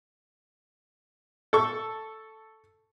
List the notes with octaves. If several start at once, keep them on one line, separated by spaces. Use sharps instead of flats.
A4 C#6